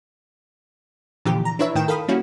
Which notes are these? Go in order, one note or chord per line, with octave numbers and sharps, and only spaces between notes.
A#2 D3 E3 F3 G4
A#5
D4 E4 B4 C#5 E5
A2 D#3 G5 E7
A4 A#4 F5 B5 D#6
G3 A#3 C#4 E4 F#4